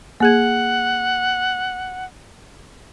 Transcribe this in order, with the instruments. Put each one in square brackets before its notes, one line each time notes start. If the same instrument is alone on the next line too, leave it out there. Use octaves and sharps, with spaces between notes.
[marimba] A#3 G#4 G#6 [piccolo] F#5